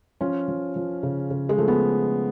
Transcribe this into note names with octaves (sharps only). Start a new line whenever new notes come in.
F3 C#4 F4
F3
F3
C#3
C#3
G#3
F3 A3
B3